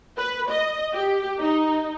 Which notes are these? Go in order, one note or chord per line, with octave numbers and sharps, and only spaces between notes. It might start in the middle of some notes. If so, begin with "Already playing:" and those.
B4
D#5
G4
D#4